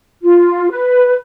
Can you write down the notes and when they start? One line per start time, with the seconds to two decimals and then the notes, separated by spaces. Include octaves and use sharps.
0.23 F4
0.71 B4